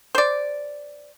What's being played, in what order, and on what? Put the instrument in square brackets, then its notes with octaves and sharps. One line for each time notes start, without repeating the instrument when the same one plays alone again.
[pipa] C5 D5